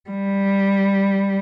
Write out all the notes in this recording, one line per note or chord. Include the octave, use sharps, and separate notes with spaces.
G3